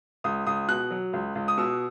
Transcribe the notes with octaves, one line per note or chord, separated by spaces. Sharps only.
C#2 D#6
C#2 D#6
B2 F#6
F#3
C#2
C#2
D#6
B2 E6